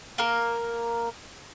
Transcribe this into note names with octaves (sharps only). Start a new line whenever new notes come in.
A#3 A#4